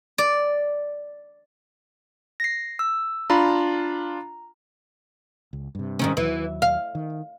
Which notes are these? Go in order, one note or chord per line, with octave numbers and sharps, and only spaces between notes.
D5
A#6 C7
E6
D4 F4 A#5 B5
C#2
G2 C3
G#2 D#3 C#4
D#2 E3 F#3
F5
D#3